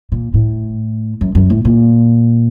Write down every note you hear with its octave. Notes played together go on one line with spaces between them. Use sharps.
A#2
A2
F#2
F#2
A2
A#2